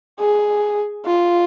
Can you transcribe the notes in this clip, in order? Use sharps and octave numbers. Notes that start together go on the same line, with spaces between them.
G#4
F4